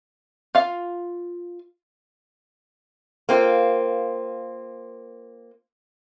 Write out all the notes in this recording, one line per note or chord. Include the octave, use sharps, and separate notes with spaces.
F4 F5
A#3 C4 F4